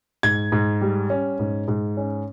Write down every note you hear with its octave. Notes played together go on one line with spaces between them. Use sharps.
G#2 G#6
G#2
G3
C#4
G#2
G#2
C#4